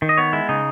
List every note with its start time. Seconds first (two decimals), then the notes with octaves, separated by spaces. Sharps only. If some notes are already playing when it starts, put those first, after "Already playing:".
0.02 D#3
0.09 D#5
0.17 B3 C#5
0.33 G#3 E4
0.49 C#3 D#4